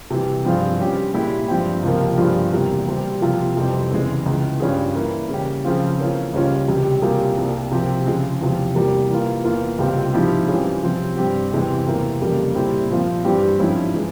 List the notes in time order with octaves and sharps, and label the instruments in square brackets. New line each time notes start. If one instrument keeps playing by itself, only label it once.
[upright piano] C3 E3 G3
G2 F3 C4 F4 G#4
G2 G3 C#4 G4
A#2 G#3 E4 G4
G2 F3 C4 G4
C#2 C3 F3 A#3
G2 F3 C4 F4 G#4
E2 C3 G3 A#3
C3 G3 C4
C3 F3 A#3 F4
F2 C3 E3 G3 C4
E2 C#3 E3 G#3
C#2 C#3 E3
G2 G3 C#4 F4 G#4
E3 A#3 E4
C#3 G3 C#4 G4
C#3 F3 C4 F4
E3 A#3 C#4 F4
C#2 C#3 G3 C#4 F4
C#2 C3 G3
C3 G3 A#3 F4 G#4
C2 C3 G3 A#3
C3 F3 C4 G4
C#3 F3 G#3
E2 C3 F3
E2 C3 G3 A#3
E3 A#3 F4
E2 E3 A#3 F4
C#2 C3 G3 C4 F4
G#2 F3 C4 E4 G4
E3 G3 C#4 F4 G#4
C3 F3 C4
G2 G3 C4 G4
E2 C3 E3 G#3 C4
E2 C3 E3 A#3
F2 C#3 G3 A#3
A#2 G3 C4 E4 G4
A#2 F3 C4 F4
G2 E3 G3 C4 G4
G#2 F3 G#3 C#4 E4
E3 G#3